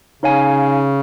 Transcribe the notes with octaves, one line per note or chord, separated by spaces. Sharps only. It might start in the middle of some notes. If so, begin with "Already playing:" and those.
C#3 D#4 C#5 F5 G#5